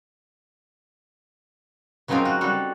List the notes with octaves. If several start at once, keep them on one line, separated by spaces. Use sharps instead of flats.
C#3 F#3 C4 D#4 F4 A#4
F#4
G3 F#4 A4